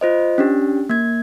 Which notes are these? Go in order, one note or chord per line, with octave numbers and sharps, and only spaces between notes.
F4 C5 D#5
C#4 D4 G4
A#3 G#6